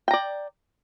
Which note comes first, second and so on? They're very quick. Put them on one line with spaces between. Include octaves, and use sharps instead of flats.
G5 A#5 D5